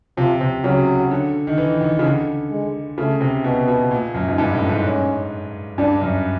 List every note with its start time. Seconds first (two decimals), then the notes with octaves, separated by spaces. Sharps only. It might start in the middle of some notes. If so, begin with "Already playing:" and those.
0.17 C3 F3
0.41 C3
0.64 C#3 F#3
1.11 D3
1.47 D#3
1.58 E3
1.81 D#3
1.99 C#3
2.04 D3
2.51 G#3
2.98 C#3 A3
3.21 C3
3.44 B2 B3
3.68 B2
3.91 A#2
4.14 F#2
4.28 G#2
4.38 G2
4.54 A2
4.69 G#2
4.85 C#4
5.78 G2 D4
6.01 F#2